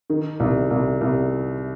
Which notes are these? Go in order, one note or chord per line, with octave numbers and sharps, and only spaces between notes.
D#3
C2
C2
C2